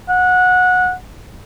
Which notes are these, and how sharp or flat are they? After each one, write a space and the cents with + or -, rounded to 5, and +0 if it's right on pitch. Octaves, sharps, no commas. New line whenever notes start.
F#5 -20